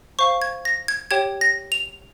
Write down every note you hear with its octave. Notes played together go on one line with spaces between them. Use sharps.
C5 F5 C#6
G#6
A#6
G#6
G4 C#5 G5 G#6
A#6
F7